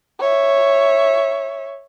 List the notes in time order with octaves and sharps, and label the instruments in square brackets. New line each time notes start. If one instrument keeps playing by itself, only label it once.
[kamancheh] C#5 E5